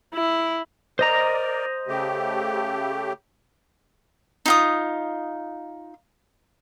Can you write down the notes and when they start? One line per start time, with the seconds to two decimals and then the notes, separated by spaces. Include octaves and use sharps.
0.14 E4
0.99 A#4 C5 D5 D#5 A#5
1.88 C#3 A3 G4
4.46 D#4 F4 D#6